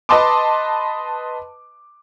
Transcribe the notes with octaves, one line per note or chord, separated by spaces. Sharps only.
B4 D#5 A5 C6 D6